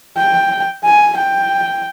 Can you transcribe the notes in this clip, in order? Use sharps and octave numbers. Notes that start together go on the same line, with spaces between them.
G5
G#5
G5